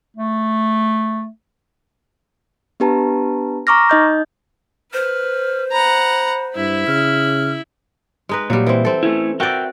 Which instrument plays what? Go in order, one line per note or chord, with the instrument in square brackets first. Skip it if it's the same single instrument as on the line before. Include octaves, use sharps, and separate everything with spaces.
[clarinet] A3
[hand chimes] B3 D4 G4 B4 A5 A#5
A#5 C#6 D6 F6 A#6
D#4 D#5 G6
[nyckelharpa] B4 [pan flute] C5 [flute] F6
[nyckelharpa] F#5 A#5 [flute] B5
[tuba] G2 [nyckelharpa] E4 B5
[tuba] C#3 [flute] F6
[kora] G#3 D#4 B4
[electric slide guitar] A#2 [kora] F#3 G3
[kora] E3 C4
C4 A4
[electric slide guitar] A3 C#4 E4
[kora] F#4 D5 [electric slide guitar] A#4 E5 G5